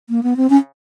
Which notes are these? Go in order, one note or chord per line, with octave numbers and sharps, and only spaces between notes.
A#3
B3
C4
C#4